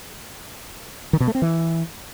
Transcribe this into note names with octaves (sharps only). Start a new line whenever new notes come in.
D#3
B2
A3
C4
E3